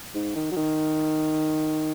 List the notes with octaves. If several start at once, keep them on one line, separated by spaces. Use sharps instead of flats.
G#2
D#3
F#3
D#3